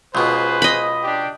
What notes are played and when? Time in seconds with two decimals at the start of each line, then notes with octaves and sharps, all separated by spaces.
0.15 C#2 B2 G#4 B4 C5
0.62 D#5 B5
1.04 D4 G4